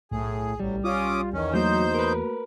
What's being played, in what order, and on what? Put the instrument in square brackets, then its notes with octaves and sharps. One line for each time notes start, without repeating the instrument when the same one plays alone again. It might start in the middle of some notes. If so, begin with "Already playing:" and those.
[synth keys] B1 [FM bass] A2 [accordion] G#4
[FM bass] A1 [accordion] F#3 [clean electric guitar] G3
[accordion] C#4 D6 D#6 [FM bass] F4
[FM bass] E2 [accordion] D#3 C#4
[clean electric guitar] F#3 [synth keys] A3 A#3 F#4 [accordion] D#4 C5 G6
[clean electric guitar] A#4 B4